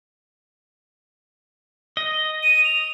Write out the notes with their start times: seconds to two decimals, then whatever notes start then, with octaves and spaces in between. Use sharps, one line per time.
1.97 D#5
2.43 D#7
2.65 F7